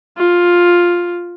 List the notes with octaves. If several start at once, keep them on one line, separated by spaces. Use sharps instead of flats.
F4